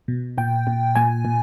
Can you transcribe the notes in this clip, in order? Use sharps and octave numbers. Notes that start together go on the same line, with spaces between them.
B2
A#2 G5
A#2
A#2 G#5
A#2